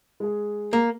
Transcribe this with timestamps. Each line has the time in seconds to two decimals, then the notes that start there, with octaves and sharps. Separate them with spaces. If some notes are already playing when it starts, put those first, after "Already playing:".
0.20 G#3 G#4
0.73 A#3